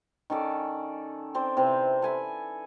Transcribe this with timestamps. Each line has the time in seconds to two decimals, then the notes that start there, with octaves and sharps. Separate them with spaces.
0.30 D#3 C#4 A4 D5
1.35 C4 C5 D5
1.57 C3 E3 C4 C6
2.02 A4 G#5 B5